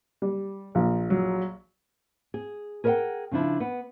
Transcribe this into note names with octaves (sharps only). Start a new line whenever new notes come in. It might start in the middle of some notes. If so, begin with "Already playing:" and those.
G3
A#1 F3
F#3
G#4
G#4 A#4 B4 E5 F#5 G5
C#3 F3 D4 E4
B3